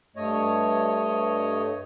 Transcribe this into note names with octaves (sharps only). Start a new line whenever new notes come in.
G2 A3 C#5 D#5